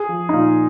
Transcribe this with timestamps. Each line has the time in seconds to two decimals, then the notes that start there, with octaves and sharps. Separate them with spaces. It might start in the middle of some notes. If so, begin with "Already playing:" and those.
Already playing: G#4
0.09 F3
0.29 D#4
0.33 A#2 F4